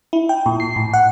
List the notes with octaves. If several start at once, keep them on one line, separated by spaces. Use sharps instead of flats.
E4
G5
A#2
C7
A2
F#5